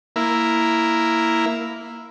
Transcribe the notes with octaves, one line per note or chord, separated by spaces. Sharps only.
A#3 E4